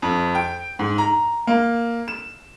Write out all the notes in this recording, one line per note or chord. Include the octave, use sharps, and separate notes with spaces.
F2
G5
G#2
A#5
A#3
E7